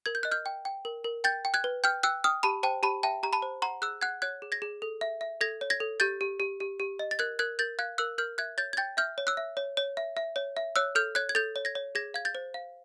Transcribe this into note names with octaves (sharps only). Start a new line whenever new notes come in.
A#4 G#6
G6
D#5 F#6
F6 G6
G5
G5
A#4
A#4
G5 G6 A6
G5
F#6 G#6
B4
G5 F6 G6
G5 E6 F#6
G5 D#6 F6
G4 A5 B5
C5 G5 A5
G4 A5 B5
E5 G5 A5
G4 A#5
A5 B5
C5
F#5 A#5 C6
G#4 E6 F#6
F#5 F#6 G#6
C#5 F#6 G#6
G#4
G#6 A#6
G#4
A4
E5
E5
A4 G#6 A#6
C#5
G#6 A#6
A4
G4 G6 A6
G4
G4
G4
G4
D#5
A6
A#4 F#6 G#6
A#4 F#6 G#6
A#4 G6 A6
F5 F#6 G#6
A#4 E6 F#6
A#4 F6 G6
E5 F#6 G#6
C#5 G6 A6
G#6
G5 G6 A6
E5 F6 G6
C#5
E6 F#6
E5
C#5
C#5
E5
E5
C#5
E5
C#5 E6 F#6
A4 F6 G6
C#5 F#6 G#6
G#6
A4 G6 A6
C#5
G#6 A#6
C#5
G#4 G#6 A#6
F5 G#6
G6 A6
C5
F5